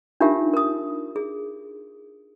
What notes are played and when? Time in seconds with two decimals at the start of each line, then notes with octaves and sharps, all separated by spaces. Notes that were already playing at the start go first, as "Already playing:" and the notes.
0.21 D4 D#4 F4 G4 A#4 E5
0.54 A#4 D#6
1.16 G#4